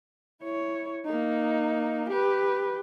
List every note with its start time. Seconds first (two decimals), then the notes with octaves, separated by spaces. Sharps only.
0.42 E4 C#5
1.05 A#3 D#4
2.10 G4 B4